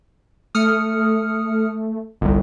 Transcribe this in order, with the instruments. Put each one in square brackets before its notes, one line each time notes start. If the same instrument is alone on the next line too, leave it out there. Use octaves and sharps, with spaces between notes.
[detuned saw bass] A3 [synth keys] D#6 F6 C#7
[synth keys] G1 C2